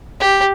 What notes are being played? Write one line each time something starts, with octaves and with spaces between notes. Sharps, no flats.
G4